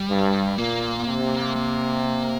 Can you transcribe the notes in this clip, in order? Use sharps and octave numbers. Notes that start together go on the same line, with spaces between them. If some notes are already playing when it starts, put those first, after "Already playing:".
Already playing: G3
G2
A#2 A#3
C3
A#3